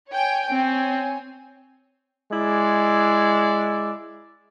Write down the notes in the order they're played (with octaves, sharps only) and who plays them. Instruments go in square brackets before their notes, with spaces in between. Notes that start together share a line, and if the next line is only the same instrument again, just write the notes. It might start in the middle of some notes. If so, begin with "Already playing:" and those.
[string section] C#5 G5 G#5
[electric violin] C4 [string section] C#5 G#5
[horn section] G#3 E4 D5